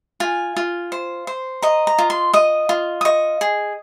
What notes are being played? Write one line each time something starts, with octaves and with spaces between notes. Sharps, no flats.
F4 G#5
F4
C5
C5
D#5 A#5
A#5
F4
C6
D#5 D#6
F4
D#6
D#5 C#6
G#4